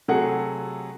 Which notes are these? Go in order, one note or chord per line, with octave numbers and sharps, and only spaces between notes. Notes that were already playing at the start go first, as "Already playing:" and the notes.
C3 F#3 A3 G#4 A4 F#5